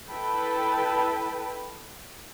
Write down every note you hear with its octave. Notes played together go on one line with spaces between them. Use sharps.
E4 A4 B4 G5 A5 B5